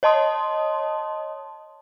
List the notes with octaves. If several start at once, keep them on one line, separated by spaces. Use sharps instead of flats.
C#5 D#5 A5 C6 D#6